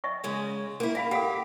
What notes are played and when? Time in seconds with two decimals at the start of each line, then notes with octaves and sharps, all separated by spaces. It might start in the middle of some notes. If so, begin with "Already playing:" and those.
0.04 D#5 E5 C#6
0.24 C#3 G#3 C#4
0.80 A#3 E4
0.95 G4 E5 F5 B5
1.11 G4 A4 F5 F#5